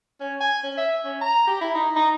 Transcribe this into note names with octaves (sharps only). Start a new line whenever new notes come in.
C#4
G#5
C#4
E5
C#4
A#5
G4
E4
D#4
D#4